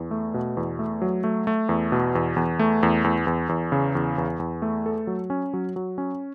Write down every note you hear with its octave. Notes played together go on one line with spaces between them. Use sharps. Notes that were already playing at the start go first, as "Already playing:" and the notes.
Already playing: E2
A3
B2
E2
A3
F#3
A3
A3
E2
B2
E2
E2
A3
E2
E2
E2
E2
C#3
E2
E2
E2
A3
A4
F#3
C#4
F#3
F#3
C#4